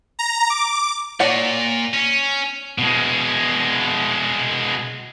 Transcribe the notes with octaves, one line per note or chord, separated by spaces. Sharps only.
A#5
D6
A#2 C#5 D5 F#5
C#4
B2 G#3